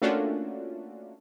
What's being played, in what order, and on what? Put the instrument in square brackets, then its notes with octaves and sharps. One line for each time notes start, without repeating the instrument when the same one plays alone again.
[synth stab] A3 A#3 C#4 D4 F4 F#4